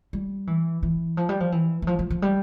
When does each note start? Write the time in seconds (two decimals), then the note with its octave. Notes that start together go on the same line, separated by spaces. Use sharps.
0.13 G3
0.47 E3
0.83 E3
1.17 F3
1.29 G3
1.40 F3
1.52 E3
1.82 E3
1.87 F3
1.99 F3
2.10 F3
2.22 G3